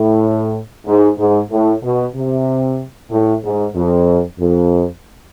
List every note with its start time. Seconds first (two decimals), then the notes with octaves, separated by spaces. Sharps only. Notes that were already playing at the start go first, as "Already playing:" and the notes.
Already playing: A2
0.86 G#2
1.18 G#2
1.51 A2
1.82 B2
2.15 C3
3.11 A2
3.43 G#2
3.75 F2
4.39 F2